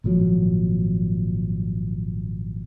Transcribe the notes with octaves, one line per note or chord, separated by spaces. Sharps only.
G#1 A#2 F3 F#3